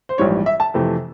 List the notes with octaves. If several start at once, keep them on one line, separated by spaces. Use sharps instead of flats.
C5
A#1 G#2 E3 G3 C#5
E5
A5
F2 C3 E3 A3